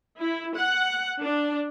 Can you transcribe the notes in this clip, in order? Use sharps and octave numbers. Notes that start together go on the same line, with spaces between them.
E4
F#5
D4